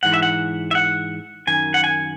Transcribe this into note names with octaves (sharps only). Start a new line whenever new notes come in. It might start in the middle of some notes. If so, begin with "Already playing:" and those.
G#2 E3 F#5
E5
F#5
E5
F#5
F#2 D#3 G#5
F#5
G#5